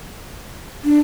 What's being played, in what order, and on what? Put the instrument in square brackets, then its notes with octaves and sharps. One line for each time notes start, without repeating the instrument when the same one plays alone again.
[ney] D4